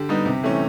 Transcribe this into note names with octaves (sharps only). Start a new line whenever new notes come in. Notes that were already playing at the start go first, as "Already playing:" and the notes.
Already playing: D3 G4
G3 B3 D#4
C3
E3 A3 C#4